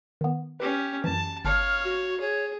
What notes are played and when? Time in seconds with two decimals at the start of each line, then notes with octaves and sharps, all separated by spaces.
0.21 D#3 B3
0.60 C#4 G4 B4
1.04 F#2 E3 A5
1.45 G1 C#5 F5 A5 F6 D7
1.84 F#4
2.21 G#4 C#5